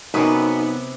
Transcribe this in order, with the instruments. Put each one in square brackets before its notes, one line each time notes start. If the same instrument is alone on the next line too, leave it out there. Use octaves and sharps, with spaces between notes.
[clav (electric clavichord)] F#2 [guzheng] C3 B4 [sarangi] B3 [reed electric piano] D#4 D#6